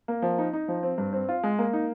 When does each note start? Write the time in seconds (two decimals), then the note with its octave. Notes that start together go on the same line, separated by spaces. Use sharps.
0.08 A#3
0.22 F3
0.38 D#4
0.53 D#4
0.68 F3
0.83 C4
0.98 G2
1.13 C4
1.29 F4
1.43 G#3
1.59 A#3
1.73 D#4